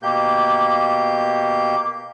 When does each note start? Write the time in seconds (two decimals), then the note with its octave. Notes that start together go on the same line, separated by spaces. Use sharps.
0.03 B2 A#3 G4 G6